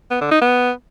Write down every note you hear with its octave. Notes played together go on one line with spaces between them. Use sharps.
B3
D3
D#4
B3